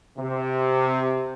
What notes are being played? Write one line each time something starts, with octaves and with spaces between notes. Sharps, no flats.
C3